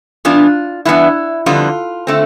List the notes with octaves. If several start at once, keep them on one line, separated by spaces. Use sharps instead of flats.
G2 E3 B3 D4 F4
G2 E3 B3 D4 E4
F2 D3 G3 B3 D4 F4
D3 A3 C4